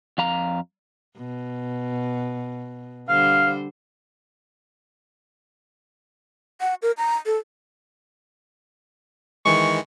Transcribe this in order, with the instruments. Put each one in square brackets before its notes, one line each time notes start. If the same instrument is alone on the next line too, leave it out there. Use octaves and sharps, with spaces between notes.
[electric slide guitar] F2 F5 A#5
[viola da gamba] B2
[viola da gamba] D3 G3 C5 [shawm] F5
[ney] F#5
A#4
A#5
A4
[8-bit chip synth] D#3 E3 G#3 [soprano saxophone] C#6